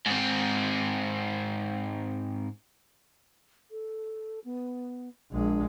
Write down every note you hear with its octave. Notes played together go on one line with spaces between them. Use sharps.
G#2 C4
A4
B3
A#1 G#3 D4